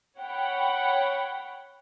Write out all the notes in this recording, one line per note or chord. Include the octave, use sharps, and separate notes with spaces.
C#5 F#5 G5 B5